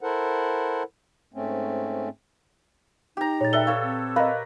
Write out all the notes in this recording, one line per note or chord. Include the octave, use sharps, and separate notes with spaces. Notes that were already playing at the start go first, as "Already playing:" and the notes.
E4 A4 A#4 C5 F#5
G#2 A3 C4 C#4
D#4 G4 A#5
A#2 C#5 A6
A4 B4 D5 E5 G5 G7
A4 C#5 F5
C4
A#4 B4 D#5 F5 B5